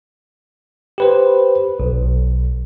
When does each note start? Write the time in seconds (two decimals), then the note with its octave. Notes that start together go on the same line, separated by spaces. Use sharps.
0.98 G4 B4 C5
1.80 B1